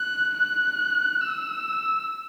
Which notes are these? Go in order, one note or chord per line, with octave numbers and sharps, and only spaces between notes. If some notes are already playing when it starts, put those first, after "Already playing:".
Already playing: F#6
F#6
E6